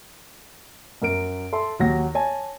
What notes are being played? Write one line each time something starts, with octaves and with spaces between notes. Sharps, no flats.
F#2 A#4 D7
A4 E5 C6
D#2 F#3 A#6
C#5 G#5 A5